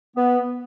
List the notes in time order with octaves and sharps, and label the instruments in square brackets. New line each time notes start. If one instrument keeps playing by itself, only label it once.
[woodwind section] B3